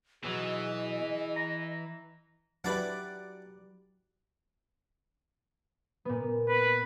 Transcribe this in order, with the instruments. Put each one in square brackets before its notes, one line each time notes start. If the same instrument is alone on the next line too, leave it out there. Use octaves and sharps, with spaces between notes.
[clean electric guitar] B2 F#3 [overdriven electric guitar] E3 [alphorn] G#4 [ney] D#5
[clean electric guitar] A#5
[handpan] F#3 G4 [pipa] D4 E4 B4 [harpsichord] D5 F#5
[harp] A#2 B3
[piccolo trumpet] B4